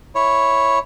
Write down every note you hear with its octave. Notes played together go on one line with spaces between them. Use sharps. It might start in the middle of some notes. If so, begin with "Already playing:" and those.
E4 C#5